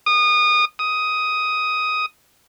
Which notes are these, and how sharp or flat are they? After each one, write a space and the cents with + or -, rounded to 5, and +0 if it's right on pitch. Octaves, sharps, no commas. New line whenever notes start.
D#6 -25
D#6 +10